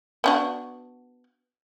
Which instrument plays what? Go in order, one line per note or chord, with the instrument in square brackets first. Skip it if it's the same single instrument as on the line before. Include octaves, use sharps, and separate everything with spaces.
[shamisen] B3 D4 F#4